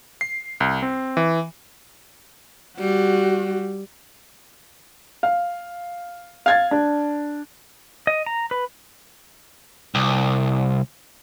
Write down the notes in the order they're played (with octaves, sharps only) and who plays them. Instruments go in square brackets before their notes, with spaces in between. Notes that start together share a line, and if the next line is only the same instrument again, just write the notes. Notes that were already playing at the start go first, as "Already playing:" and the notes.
[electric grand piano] C7
C2
C4
E3
[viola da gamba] G3 [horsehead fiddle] F#4
[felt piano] F5
F5 G#6 A6
D4
[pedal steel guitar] D#5
A#5
B4
[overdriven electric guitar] C2